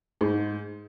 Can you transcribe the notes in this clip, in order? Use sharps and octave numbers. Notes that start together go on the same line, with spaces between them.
G#2